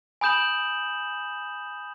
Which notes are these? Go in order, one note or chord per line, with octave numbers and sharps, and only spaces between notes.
G#5 B5 D#6 G6 E7 F#7